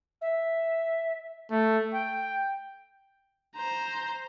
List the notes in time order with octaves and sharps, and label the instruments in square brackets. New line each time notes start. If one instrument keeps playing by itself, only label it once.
[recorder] E5
[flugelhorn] A3
G5
[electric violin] C5 A#5